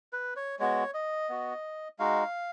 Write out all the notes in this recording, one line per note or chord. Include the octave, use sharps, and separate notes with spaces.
B4
C#5
G#3 B3 F#4 C#5
D#5
B3 F#4
G#3 D#4 F#4 F5